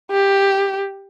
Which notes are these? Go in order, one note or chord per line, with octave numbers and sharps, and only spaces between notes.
G4